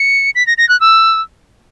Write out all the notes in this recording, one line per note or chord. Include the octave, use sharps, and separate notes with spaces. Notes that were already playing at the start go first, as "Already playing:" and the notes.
Already playing: C#7
B6
A#6
A#6
F#6
E6